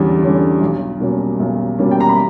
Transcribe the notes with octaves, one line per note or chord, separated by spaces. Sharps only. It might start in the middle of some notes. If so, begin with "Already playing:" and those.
Already playing: E2 D3 G3 C#4
D3 G3 C#4
B1
B2 G3 A#3 C#4
B1
B2 G3 A#3 C#4
G5
A#5
B5